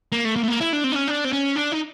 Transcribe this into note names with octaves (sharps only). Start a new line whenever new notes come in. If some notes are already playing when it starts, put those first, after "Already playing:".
A#3
A3
A#3
A3
A#3
E4
D4
C4
D4
C#4
D4
C4
C#4
D4
D#4